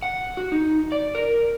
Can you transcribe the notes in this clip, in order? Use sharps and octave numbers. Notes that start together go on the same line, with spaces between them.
F#5
F#4
D#4
D5
A#4